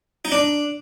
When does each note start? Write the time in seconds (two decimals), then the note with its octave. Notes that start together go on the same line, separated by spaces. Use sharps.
0.25 D#4
0.32 D4